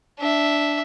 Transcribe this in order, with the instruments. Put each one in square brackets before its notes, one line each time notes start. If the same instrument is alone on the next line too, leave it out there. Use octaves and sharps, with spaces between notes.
[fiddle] D4 E5